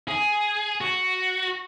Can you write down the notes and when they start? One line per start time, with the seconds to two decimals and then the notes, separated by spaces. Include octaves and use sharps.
0.08 G#4
0.81 F#4